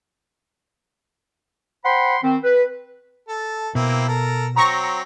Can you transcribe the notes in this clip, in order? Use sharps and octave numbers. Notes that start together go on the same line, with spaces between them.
C5 F#5 G5 B5 C6
D#3 C4
B4
A4
B2 A#3 C4 E4
A4 A#4
F#3 C4 A#5 C#6 A#6